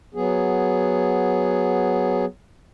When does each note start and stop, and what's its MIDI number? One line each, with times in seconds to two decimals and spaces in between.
0.14 2.25 54
0.14 2.25 59
0.14 2.25 68